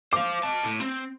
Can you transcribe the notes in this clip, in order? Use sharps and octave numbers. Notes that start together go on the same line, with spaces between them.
C5 F5 D6
D#5 A5
A2
C4